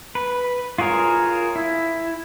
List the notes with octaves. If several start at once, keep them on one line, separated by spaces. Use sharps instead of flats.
B4
F4 F#4 G#4 A#4 C#5
E4